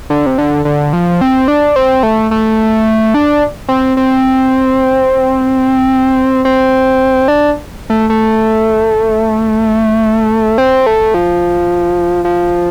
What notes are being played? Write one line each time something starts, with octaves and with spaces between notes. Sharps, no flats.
D3
C3
D3
D3
F3
C4
D4
C4
A3
A3
D4
C4
C4
C4
D4
A3
A3
C4
A3
F3
F3